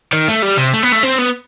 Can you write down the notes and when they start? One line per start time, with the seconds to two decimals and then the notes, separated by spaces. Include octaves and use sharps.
0.13 D#3
0.28 A3
0.43 G3
0.58 C3
0.74 A3
0.83 B3
0.92 A3
1.03 C4
1.18 B3